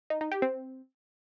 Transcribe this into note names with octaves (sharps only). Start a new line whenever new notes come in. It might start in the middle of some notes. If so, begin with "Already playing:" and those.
D#4
D#4
G4
C4